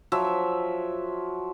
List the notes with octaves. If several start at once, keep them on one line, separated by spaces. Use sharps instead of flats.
F3 F#3 E5